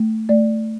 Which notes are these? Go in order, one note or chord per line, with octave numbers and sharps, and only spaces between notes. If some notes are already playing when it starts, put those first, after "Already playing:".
Already playing: A3
A3 D5